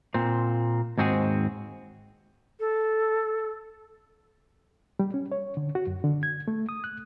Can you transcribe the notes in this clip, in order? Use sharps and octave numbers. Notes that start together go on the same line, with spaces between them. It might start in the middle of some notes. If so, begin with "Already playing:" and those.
A#2 C4
D#2 G#2 C4 F#4 G#4
A4
G3
C#4
C#5
D3
F#4
F#2
D3
G#6
A3
D#6
F#6